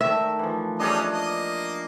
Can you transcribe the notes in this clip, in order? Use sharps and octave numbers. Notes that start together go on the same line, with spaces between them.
D#3 A3 E5
E3 F3
G3 C#4 D4 G#4 A#4 D#5
A#3 D#5